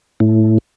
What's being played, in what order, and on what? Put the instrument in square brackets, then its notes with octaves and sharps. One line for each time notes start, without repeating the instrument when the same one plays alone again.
[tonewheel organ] A2